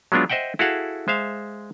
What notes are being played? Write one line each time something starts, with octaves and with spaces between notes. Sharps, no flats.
F#3 G#3 B3 D4 F4
C5 D#5 E5 F#5 G5
E4 F#4 G#4 A4 F5 F#5
G#3 C5 E5 F5